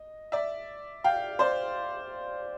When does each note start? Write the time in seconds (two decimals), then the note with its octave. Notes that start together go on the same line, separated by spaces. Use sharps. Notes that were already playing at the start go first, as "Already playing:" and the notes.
Already playing: D#5
0.32 D5 E5
1.04 F5 G5
1.39 C5 D5